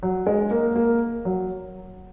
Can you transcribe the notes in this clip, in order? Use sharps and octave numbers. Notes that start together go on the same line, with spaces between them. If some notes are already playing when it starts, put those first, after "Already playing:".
F#3
G#3
A#3
A#3
F#3